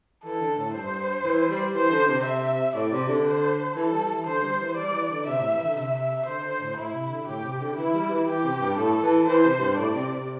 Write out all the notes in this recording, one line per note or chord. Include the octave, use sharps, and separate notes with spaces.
E3 A4
D3
A2
G2 C5
E3
G3
E3 C5
D3
C3
E5
A2 D5
C3
D3
C5
E3 A4
G3
E3
D3 C5
G3
E3
G3 D5
E3
D3
C3 E5
A2
E3
D3
C3 E5
D3 C5
D3
A2
A2 E4
C3
D3
A2 G4
C3
D3
E3 E4
G3
E3
E3 G4
C3
G2
A2 A4
E3
E3 C5
C3
G2
A2 D5
C3
C3